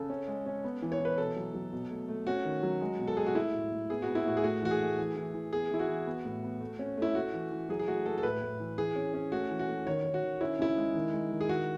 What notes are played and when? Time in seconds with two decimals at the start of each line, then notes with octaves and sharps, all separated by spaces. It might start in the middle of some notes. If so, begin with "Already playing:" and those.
Already playing: C#3 A4
0.10 C#4
0.28 G#3
0.46 C#4
0.64 B3
0.82 E3
0.92 C#5
1.00 E3 B4
1.18 B2 A4
1.36 F#3
1.54 F#3
1.73 B2
1.91 A3
2.09 A3
2.27 C#4 F#4
2.45 D#3
2.63 F#3
2.81 G#3
2.99 B2
3.07 A4
3.17 G#3 G#4
3.26 F#4
3.35 A3 E4
3.53 A2
3.72 A2
3.90 B3 G#4
4.02 F#4
4.07 B3
4.15 E4
4.26 A2 F#4
4.37 G#4
4.44 A3 F#4
4.62 E3 F#4
4.71 G#4
4.80 A3
4.98 E3
5.16 E3
5.34 E3
5.53 B3 G#4
5.71 E3 E4
5.79 F#4
5.88 E3
6.07 B3
6.25 A2
6.43 B3
6.61 A3
6.79 C#4
6.98 A3 E4
7.15 A3 F#4
7.34 E3
7.51 E3
7.69 F#3 G#4
7.79 G#4
7.87 A3 F#4
8.06 A3 A4
8.18 A4
8.23 A2 B4
8.42 A2
8.60 E3
8.78 E3 G#4
8.96 C#4
9.14 C#4
9.32 A3 F#4
9.50 E3
9.59 F#4
9.68 A3
9.86 D#3 C#5
10.05 D#3
10.14 F#4
10.23 D#3
10.41 C#4 E4
10.59 C#3 E4
10.77 G#3
10.94 D#3
11.13 G#3
11.31 D#3
11.41 G#4
11.49 D#3 F#4